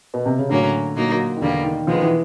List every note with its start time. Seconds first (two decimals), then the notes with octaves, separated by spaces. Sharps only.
0.14 B2
0.26 C3
0.38 C#3
0.49 A2 D3 F#3 A#3 C#4
0.96 A#2 F#3 A#3 D#4
1.37 D#3
1.41 E2 B2 D3 G3 A#3
1.64 D#3
1.87 B2 F3 G#3 B3
1.95 D#3
2.02 E3